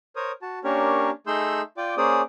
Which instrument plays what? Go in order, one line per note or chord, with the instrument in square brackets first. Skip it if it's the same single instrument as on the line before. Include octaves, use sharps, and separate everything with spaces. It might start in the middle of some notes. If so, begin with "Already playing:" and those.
[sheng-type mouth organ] A#4 C5 C#5 D#6
F#4 A5
A#3 C#4 D4 G4 A#4 C#5
A3 D#4 G#4 C6 E6 G6
F4 D5 G5 D6
A#3 C#4 G#4 C5 D5 D#6